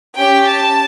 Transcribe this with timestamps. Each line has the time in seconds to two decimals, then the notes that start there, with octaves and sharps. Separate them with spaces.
0.17 C#4 G4 G5
0.46 A5